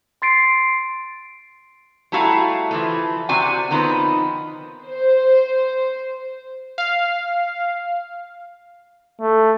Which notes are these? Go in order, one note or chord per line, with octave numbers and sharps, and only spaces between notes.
C6 A6 C7 D7
G3 A3 E4 F#4 F5 A#5
E3 F3 A3
C3 C4 F#4 D5 G#5
D#3 F3 B3 C4 D#4 B4
C5
F5
A3